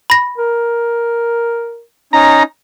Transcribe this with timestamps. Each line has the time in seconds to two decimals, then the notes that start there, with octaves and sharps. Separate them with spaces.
0.10 B5 A#6
0.38 A#4
2.13 C#4 D#4 A#5